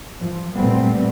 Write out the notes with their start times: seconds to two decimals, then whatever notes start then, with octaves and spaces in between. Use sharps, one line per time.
0.21 F3
0.55 A#2 G3 A3 B3 C4